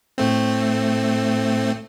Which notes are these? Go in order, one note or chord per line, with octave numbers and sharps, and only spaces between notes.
A2 A3 C4